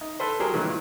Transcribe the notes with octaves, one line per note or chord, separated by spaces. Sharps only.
D#4
A4 B4 C5
F#3 G4 G#4 A#4 C5
G2 A#2 D#3 E3 F#3 G#3